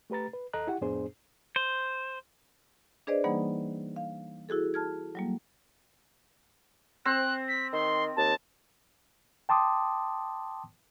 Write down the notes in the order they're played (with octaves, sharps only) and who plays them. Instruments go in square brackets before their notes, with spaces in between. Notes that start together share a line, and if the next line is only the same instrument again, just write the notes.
[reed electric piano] A3 G4 B4 A#5 A6
B4
D#2 A4 D#5 A#5 F#6
E4 G4 F#5
F2 A2 B3 D4 G#4 C5
[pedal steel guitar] C5
[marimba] D4 G#4 B4 C5 D5 D#5
E3 G3 A#3 D#4 F#5 B5
F5
E4 F#4 G#4 A4
A5 F6 G#6
F#3 G3 A#3
[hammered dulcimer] C4 [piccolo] F#6
[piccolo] B6
[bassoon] D#3 [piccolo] C6
[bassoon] D#2 [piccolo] A5
[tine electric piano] G5 A5 C6 D6 D#6